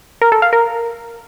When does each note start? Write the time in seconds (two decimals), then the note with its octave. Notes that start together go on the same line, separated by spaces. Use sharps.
0.22 A#4
0.32 A4
0.42 F5
0.53 A#4